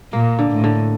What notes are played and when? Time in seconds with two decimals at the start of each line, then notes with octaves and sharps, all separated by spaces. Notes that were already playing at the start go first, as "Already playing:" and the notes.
0.13 A#2 A#3
0.39 D3
0.51 A2
0.64 D3